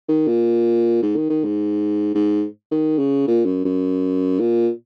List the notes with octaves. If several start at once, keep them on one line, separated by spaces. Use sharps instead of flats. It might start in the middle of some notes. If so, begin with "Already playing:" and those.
D#3
A#2
G#2
D#3
D#3
G#2
G#2
D#3
C#3
A#2
F#2
F#2
A#2